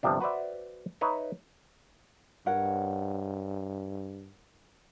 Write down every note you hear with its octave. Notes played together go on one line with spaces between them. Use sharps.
G1 C3 F3 D4
F#4 B4 C5 D5 E5
D#4 B4 C#5 E5
G2 A#4 C#5 F#5